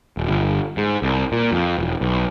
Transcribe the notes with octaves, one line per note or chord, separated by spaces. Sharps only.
D#1
G1
G#2
C2
A#2
F2
E1
B1